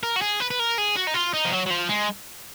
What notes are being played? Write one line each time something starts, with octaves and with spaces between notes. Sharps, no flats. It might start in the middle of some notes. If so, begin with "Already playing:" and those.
A#4
F#4
G#4
B4
B4
A#4
G#4
F#4
D#4
F4
D#4
F3
F#3
F#3
F3
G#3